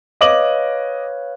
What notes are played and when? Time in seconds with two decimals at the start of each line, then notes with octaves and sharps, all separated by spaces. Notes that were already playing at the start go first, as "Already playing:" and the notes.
0.21 B4 C#5 D#5 F5 D6 F#7